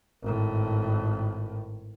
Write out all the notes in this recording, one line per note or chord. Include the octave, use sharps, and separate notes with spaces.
G#1 A2